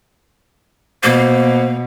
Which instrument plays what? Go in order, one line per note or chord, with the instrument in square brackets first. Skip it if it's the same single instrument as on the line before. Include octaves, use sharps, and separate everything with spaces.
[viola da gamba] B2 [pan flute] A#3 [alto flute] C5